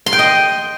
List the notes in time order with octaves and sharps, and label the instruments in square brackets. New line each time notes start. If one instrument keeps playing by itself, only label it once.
[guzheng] C6
G5
D#5